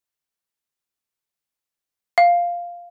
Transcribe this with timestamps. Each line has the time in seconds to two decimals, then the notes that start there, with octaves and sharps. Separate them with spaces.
2.18 F5